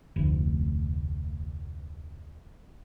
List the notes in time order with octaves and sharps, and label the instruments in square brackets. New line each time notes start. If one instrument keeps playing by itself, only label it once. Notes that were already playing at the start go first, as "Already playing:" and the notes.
[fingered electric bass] F1 D2